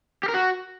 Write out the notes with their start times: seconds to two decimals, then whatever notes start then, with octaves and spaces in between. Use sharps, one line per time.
0.23 G4
0.29 A#4
0.34 F#4